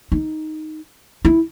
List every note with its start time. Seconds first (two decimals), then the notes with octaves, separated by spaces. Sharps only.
0.12 D#4
1.25 E4